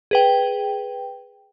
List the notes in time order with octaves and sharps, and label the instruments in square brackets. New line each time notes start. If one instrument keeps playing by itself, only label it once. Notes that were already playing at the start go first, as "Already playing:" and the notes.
[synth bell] G#4 B4 G5